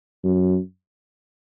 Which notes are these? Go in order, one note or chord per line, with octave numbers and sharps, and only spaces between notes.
F#2